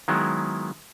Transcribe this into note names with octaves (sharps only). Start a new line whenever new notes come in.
D#3 F#3 G#3 B3 E4